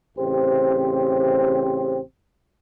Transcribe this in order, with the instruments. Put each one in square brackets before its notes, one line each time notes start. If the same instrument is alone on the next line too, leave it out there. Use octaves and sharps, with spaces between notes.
[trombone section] A1 C#3 C4 G4 C5